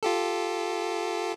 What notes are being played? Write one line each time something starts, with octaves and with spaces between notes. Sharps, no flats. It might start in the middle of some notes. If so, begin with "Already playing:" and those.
F4 G4 A4